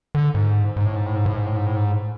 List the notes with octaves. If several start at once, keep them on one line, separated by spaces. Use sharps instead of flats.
D3
G#2
G#2
A2
G#2
A2
G#2
A2
G#2
A2
G#2
A2
G#2